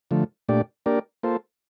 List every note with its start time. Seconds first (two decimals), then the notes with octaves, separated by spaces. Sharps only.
0.11 D3 F3 A3
0.48 A#2 A3 D4 G4 D5
0.86 A#3 D4 G4 A#4 D5
1.23 A#3 F4 A4 C5